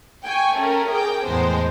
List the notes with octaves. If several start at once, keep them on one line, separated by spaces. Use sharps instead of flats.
G5 G#5 C#6
A3 C#4 A#4
G#4 A#4 G5 D6
E2 A2 G#3 B3 C5 A5